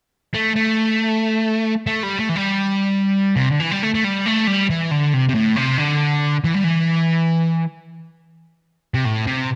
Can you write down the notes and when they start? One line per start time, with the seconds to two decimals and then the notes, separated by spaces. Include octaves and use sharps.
0.34 A3
0.56 A3
1.86 A3
2.03 G3
2.19 A3
2.29 E3
2.36 G3
3.36 C3
3.48 D3
3.60 E3
3.71 G3
3.82 A3
3.94 A3
4.04 G3
4.26 A3
4.47 G3
4.70 E3
4.91 D3
5.13 C3
5.29 C3
5.35 A2
5.56 C3
5.78 D3
6.44 E3
6.54 G3
6.64 E3
8.94 C3
9.05 A2
9.27 C3